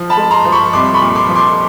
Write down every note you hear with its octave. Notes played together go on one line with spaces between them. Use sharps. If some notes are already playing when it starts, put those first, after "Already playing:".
Already playing: F3
A5 B5
G#3
A#5 C6
F3
B5 C#6
C2 C6 D6
B5 C#6
A#2
C6 D6
F3
C6 D6